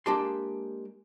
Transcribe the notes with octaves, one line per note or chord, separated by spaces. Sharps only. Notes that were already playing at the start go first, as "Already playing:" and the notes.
G#3 A#3 D4 G4 A5 C6